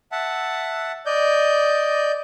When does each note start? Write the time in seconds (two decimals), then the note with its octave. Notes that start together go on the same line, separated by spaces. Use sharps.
0.12 E5 F#5 A5
1.06 D5 D#5 G6